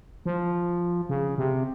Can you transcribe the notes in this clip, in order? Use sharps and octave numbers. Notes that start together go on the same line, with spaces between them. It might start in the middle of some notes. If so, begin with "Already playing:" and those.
F3
C#3
C3